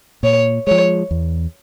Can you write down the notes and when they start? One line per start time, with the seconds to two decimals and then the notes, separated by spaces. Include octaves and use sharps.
0.23 A#2 C#5
0.67 F3 G#3 C#5
1.11 E2